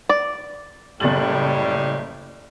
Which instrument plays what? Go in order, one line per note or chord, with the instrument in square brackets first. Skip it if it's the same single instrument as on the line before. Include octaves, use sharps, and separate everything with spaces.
[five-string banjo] D5
[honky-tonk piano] F#1 A6 F#7 [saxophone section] A2 G3